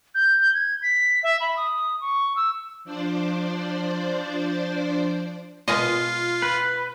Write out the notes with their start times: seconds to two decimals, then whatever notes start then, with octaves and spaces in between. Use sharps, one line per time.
0.15 G6
0.54 G#6
0.82 B6
1.23 E5
1.40 B5
1.57 D#6
2.01 C#6
2.36 E6
2.84 F3 D4 C5 D5
5.68 B2 G#3 F4 D#5 F5
6.42 B4